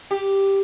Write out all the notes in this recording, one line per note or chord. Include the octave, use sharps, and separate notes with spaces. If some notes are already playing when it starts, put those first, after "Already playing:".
G4